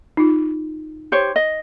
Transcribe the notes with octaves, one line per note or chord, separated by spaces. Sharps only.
D#4 F4
G4 C5 C#5
D#5